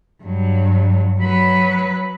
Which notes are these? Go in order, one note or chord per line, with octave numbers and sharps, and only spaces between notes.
G2 F#3
F#3 B4